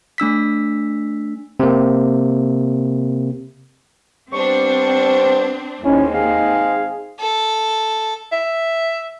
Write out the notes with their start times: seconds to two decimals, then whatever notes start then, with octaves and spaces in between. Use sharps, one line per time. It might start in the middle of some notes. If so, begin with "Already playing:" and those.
0.18 A3 D4 E6 B6
1.60 C3 A#3
4.33 G3 B3 C4 D4 C5 C#6
5.85 D#2 G#3 C4 C#4 D#4 E4
6.14 G#4 F5
7.20 A4
8.33 E5